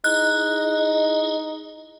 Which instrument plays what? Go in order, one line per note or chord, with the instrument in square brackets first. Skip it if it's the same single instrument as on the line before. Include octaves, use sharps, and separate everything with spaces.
[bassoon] D#4 [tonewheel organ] E4 G#4 D#5 [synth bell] F#6